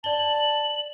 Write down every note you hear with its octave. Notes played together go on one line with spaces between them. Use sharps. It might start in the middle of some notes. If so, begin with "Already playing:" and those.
D5 A5 F#7 G7